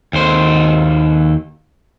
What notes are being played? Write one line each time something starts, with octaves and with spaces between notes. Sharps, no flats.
D#2 C5